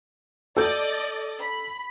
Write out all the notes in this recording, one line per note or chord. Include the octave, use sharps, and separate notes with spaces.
A4 D5 D#5 G6
B5